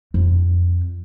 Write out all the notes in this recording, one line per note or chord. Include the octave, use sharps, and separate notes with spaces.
F2